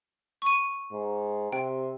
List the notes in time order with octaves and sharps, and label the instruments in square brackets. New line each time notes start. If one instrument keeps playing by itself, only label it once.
[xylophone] C#6 D#7
[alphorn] G#2
[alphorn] C3 [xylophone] G5